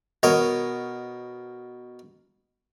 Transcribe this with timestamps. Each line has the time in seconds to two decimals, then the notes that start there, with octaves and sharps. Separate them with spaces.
0.23 B2 A#4 C#5 D#5